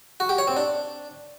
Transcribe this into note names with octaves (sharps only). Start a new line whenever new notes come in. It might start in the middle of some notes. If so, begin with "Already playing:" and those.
F#4
G4
C#5
C4
D4